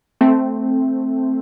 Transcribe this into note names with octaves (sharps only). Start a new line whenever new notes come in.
A3 C4